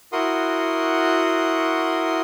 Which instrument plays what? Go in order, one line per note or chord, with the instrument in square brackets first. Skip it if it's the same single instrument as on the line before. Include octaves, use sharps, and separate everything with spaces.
[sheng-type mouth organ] E4 F#4 A#4 F#5 C6 D#6